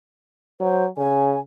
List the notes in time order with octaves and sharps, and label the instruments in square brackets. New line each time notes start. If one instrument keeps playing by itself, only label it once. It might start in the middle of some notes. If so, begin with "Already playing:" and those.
[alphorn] F#3 [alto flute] C5
[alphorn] C#3 [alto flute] G#5